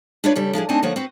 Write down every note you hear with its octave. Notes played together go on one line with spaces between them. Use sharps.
D4 E4 F4 B4 C#5 D5
C#3 G3 A4
F3 D4 E4 G#4
A3 C4 D4 D#4 G#5 A5
D3 D#3 F3 A#3 C#5 F#5
C4 F#4 B4